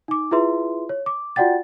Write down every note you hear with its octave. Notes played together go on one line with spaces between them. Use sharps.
D#4 D6
E4 F4 G#4 B4 E5 C6
C#5
D6
F4 F#4 D5 F#5 G5 A6